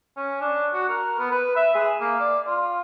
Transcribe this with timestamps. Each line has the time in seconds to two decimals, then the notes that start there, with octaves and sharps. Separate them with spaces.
0.17 C#4
0.41 D4
0.74 F#4
0.89 A#4
1.18 B3
1.31 B4
1.56 E5
1.75 G#4
2.00 A#3
2.20 D5
2.47 F4